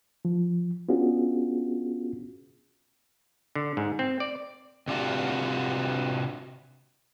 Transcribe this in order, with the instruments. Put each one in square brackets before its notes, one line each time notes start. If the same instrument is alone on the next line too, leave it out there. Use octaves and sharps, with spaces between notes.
[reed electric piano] F3
B3 C#4 D4 F4 F#4 G#4
[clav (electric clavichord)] D3
G#2
C4
D5
[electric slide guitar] C3 D4 F4 F#4